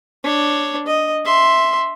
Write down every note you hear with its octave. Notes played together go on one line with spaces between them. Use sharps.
D4 C#5
D#5
E5 C6